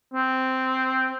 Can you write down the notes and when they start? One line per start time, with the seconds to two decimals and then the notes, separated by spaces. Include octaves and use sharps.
0.14 C4